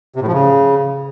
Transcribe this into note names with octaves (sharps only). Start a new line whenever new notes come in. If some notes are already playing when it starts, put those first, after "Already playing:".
C3
A2
F3
C#3